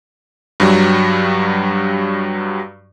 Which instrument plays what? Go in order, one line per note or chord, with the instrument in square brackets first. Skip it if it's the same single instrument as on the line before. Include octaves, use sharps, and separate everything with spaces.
[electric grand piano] G2 F#3 G3